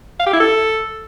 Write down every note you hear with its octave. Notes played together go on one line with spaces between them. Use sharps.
F5
G4
E4
A4